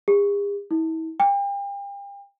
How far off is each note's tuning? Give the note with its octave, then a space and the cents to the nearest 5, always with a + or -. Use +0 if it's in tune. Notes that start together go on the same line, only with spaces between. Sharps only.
G#4 -45
E4 -40
G5 +40